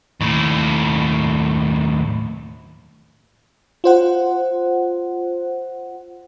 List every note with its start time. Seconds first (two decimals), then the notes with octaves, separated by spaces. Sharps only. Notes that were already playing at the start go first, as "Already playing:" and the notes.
0.21 D#2 A2
3.84 F4 C5 F#5